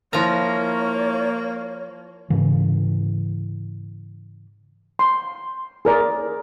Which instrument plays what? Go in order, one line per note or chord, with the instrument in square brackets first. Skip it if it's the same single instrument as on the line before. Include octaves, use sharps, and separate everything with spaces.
[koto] F3 A#5 [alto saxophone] A#3 [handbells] E4 A#4 [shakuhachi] C#5
[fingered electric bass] G#2 C#3 E3
[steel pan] C6
G#4 A#4 D5